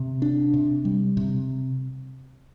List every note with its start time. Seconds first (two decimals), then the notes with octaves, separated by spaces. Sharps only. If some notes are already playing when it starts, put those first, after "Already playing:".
Already playing: C3
0.22 D4
0.54 C3
0.85 G3
1.17 C3